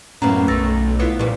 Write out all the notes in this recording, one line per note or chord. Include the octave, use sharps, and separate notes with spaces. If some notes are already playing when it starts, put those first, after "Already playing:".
F#2 A2 A#3 B3 C#4 A#5
B1 A3 E6 A6 A#6
B3 E4 F4
A#2 F3 G3 E4 G4 B4